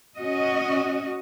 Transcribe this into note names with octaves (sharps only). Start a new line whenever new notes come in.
C#4 F#4 D#5